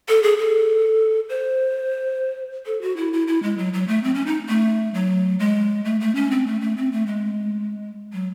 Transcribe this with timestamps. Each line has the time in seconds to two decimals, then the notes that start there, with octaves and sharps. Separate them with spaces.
0.09 A4
0.23 G#4
0.38 A4
1.29 C5
2.66 A4
2.82 F#4
2.97 E4
3.13 E4
3.27 E4
3.43 G#3
3.58 F#3
3.73 F#3
3.88 A3
4.03 C4
4.15 C#4
4.26 D#4
4.49 A3
4.94 F#3
5.40 G#3
5.85 A3
6.01 A3
6.15 C#4
6.31 C4
6.47 A3
6.61 A3
6.77 C4
6.92 A3
7.07 G#3
8.13 F#3